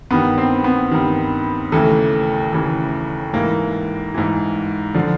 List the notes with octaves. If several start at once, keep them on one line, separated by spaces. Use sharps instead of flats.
G2 D#3 B3
C4
B3
G2 D#3
D#2 C#3 E3 A3
D#2 C#3 E3
G#2 E3 A#3
G#2 E3
D3 F3